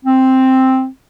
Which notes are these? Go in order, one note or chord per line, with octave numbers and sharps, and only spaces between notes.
C4